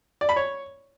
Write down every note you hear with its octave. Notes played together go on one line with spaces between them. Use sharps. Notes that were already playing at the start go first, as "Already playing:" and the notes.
D5
B5
C#5